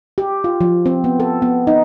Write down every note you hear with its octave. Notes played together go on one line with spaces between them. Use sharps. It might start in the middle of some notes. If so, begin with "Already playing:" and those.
G4
F4
F3
C4
B3
A4
B3
D#4